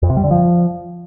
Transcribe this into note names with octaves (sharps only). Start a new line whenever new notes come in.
F2
C3
G3
D3
F3